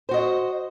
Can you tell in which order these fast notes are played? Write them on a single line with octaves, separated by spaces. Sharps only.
C5 F#4 D#5